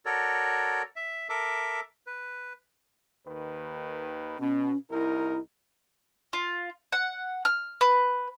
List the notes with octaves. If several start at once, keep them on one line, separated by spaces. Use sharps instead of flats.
F#4 A4 A#4 C#5 D5
E5
A4 A#4 E5 D6
B4
D#2 D#3 B4
B2 C#4
C2 D#4 E4 A#4
F4
F#5
F6
B4